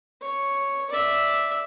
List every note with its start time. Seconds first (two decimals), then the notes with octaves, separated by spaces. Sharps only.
0.22 C#5
0.90 D5 E5